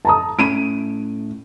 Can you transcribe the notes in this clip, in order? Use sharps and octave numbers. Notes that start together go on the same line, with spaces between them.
A5 A#5 D#6
A2 C#4 B5 D7 D#7